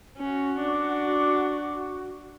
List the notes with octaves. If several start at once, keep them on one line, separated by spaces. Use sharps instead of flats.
C#4 F#4
D4 D6